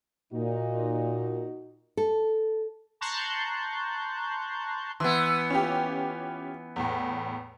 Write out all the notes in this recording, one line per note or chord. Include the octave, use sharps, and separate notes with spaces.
A#2 D#4 F#4
A4
A5 A#5 C6 C#6 F#6 G6
E3 B3 C6
C#4 F4 G4
E2 A2